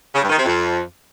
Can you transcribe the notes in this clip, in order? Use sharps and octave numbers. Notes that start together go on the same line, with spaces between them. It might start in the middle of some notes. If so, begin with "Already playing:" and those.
C#3
G2
D#3
C3
F2